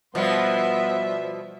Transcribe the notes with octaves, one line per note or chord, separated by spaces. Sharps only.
B2 F3 G3 B3 C5 E5